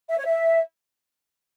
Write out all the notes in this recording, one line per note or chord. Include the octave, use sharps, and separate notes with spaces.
E5
C#5
E5